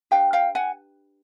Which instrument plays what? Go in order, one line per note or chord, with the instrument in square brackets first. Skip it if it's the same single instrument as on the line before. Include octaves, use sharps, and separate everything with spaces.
[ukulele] D4 G4 B4 F5 G5
F5 G5
F#5 G#5